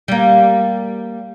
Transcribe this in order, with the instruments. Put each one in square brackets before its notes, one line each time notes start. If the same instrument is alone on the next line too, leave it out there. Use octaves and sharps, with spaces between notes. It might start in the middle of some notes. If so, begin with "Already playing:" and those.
[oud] G3 A#3